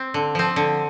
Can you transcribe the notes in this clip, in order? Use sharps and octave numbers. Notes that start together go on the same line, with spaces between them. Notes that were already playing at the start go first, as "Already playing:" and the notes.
Already playing: C4
D3
F3 C4
D3